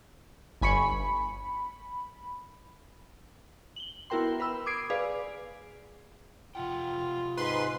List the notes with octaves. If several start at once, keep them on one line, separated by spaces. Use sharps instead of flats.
G1 G#5 B5 C#6 C#7
B5
F#7 G7
B3 E4 F#4 A#4 G5 C6
B4 B5 E6
D6 D#6 G#6 C7 D7
G#4 B4 D5 F5
C3 F4 F#5 G5
G#2 B4 C6